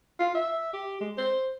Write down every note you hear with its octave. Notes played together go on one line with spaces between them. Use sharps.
F4
E5
G4
G#3
C5